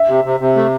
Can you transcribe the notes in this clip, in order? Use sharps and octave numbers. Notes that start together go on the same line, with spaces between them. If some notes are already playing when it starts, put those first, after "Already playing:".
Already playing: E5
C3
C3
C3
A3